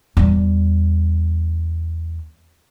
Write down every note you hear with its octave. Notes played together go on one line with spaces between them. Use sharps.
E2 G3